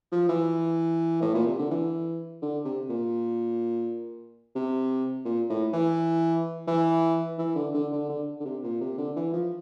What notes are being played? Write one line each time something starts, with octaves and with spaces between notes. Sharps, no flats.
F3
E3
A2
A#2
C3
D3
E3
D3
C3
A#2
C3
A#2
A2
E3
E3
E3
D3
D3
D3
D3
D3
C3
A#2
C3
D3
E3
F3